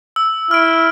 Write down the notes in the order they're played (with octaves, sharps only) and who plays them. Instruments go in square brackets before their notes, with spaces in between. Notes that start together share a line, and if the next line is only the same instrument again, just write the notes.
[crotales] E6
[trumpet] E4 [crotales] F6 D7